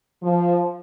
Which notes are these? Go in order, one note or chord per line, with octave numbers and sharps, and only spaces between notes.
F3